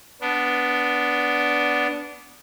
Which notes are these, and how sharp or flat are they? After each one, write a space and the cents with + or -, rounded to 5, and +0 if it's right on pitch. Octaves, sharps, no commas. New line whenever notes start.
B3 +0 D4 -15